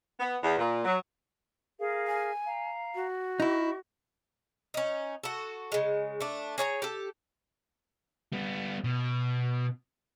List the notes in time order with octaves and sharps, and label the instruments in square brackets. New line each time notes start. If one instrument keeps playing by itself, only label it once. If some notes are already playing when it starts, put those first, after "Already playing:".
[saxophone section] B3
E2
A#2
F#3
[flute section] G#4 A#4 F5
[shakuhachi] G#5
[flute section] F5 A#5
[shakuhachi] F#4
[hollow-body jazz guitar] D#4 E4 [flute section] D#5 C#6
[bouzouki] C#4 D#4
F#4 A4
C#3 G#3
A3 D4
G#4 C#5 A5 A#5
G4 A4
[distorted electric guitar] G3 B3
B2